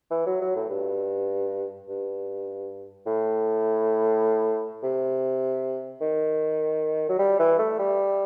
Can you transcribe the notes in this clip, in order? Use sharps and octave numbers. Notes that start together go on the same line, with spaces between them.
E3
F#3
F#3
A2
G2
G2
A2
C3
D#3
F#3
G3
E3
A3
G3